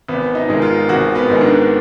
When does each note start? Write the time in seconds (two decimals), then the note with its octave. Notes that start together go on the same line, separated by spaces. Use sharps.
0.08 G#1 B3
0.35 D#4
0.49 G#2 D#3 G#3
0.62 F4
0.89 G#1 F#4
1.15 B3
1.29 G#2 D#3 G#3
1.41 D4